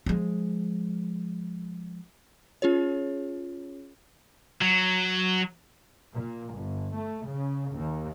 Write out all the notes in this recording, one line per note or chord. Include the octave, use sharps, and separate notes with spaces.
F3 G#3
C#4 F4 G#4 C#5
F#3
A#2
G1
A3
C#3
D#2